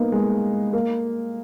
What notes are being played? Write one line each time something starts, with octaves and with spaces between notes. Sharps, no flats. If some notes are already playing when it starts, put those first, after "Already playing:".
Already playing: A#3 B3 D#4
G#3
A#3